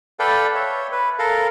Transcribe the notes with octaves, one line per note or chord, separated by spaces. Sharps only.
A4 B4 D5 F5 G5
C#5 E5
B4
A4 A#4 F5